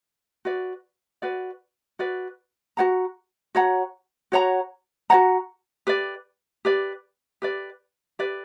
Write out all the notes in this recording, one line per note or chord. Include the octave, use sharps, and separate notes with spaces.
F#4 B4 D5
F#4 B4 D5
F#4 B4 D5
F#4 C#5 F#5 A#5
F#4 C#5 F#5 A#5
F#4 C#5 F#5 A#5
F#4 C#5 F#5 A#5
G4 B4 D5
G4 B4 D5
G4 B4 D5
G4 B4 D5